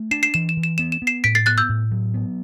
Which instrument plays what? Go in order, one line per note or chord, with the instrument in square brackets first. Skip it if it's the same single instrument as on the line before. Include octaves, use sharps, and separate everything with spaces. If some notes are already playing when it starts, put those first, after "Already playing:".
Already playing: [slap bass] A3
[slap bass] D4 [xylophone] C7 E7
[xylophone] C7 E7
[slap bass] E3 [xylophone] E7
[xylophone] E7
[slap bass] E3
[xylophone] E7
[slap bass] B3 [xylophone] E7
[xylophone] E7
[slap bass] B3
[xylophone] C7 E7
[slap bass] A2 [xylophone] B6 D7
[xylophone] A6 C7
[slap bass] B3 [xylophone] F#6 A6
[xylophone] E6 G6
[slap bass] A2
F#3
B3